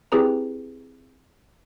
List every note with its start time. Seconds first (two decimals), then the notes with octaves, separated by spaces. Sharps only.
0.12 C4 E4 G4 G#4 B4 A#5